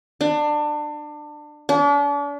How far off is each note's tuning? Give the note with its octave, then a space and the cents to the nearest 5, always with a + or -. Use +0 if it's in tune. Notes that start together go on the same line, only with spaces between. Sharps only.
D4 +25
D4 -40